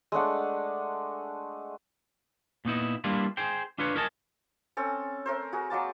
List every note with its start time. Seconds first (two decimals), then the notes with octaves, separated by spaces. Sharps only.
0.12 G#3 A3 D4 F#5
2.65 A#2 B3 D#4 E4
3.04 G3 A#3 D4 E4 F4
3.37 G#4 C5 G5
3.78 D4 F4 B4 C#5
3.96 A#4 C#5 D#5 G#5 A5
4.77 C4 C#4 A4
5.26 A3 A#4 C5
5.53 F#4 G#4 A#4
5.70 F#3 G#3 A#3 A5